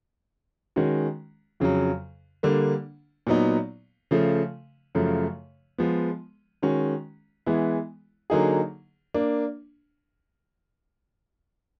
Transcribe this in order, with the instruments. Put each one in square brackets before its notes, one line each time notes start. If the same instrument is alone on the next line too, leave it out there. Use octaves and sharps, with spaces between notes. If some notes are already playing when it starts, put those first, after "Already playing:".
[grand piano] D#3 G#3 C#4 F#4
F2 C#3 F#3
D3 G3 A#3 D4
A#2 F#3 B3 D#4
C#3 F3 A3
F#2 C#3 F3 A3
F3 G#3 B3
D#3 G#3 C#4 F#4
E3 G#3 B3 E4
D3 F#3 A#3 D#4 G#4
A#3 D4